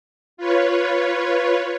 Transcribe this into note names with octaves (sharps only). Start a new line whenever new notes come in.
F4 B4 C#5